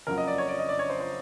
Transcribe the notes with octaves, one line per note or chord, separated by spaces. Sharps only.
F#1 F2 C#3 F#3 A#4
D#5
D5
C#5
D5
D#5
D5
C#5
C5
C5